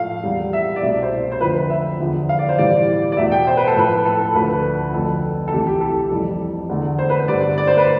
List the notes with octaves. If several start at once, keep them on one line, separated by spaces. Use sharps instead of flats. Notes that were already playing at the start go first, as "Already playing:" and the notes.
Already playing: A2 F3 A3 F5
E2 C3 G3
E5
D5
C2 B2 A3 E5
E5
C5
C5
F2 D3 F3 B4
E5
E2 D3 F3
F5
D5
C5
A2 E3 G3 D5
D5
E2 B2 A3 E5
G5
C5
B4
A4
A2 F3 A3 B4
A4
A4
D2 D3 F3 B4
F2 D3 F3 A3 A4
A4
C2 C3 E3 A3 G4
G4
A4
F2 C3 E3 G3
E2 D3 A3
C5
B4
C5
G2 D3 A3 D5
D5
C5
B4